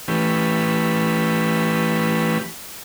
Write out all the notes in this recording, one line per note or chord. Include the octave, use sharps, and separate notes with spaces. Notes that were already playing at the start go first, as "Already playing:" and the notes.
E3 A3 C#4 G4 B4